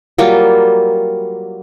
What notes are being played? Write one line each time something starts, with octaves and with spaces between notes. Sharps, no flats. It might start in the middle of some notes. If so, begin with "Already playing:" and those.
F#3 G3 A#3 F4